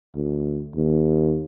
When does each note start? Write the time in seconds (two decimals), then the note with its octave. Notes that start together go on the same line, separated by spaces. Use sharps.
0.15 D2
0.75 D#2